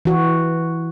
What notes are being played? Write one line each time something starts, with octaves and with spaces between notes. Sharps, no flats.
E3 F#4